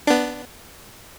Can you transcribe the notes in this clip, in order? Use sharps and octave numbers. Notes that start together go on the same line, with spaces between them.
B3 D4